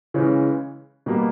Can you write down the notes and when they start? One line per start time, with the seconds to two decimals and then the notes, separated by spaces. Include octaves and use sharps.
0.14 C#3 E3 G#3 C#4
1.06 B2 G3 A#3